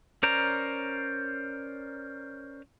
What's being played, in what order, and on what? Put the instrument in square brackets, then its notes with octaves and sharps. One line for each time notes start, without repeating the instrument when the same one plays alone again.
[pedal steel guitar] C#4 A#4 C5 D5 A#5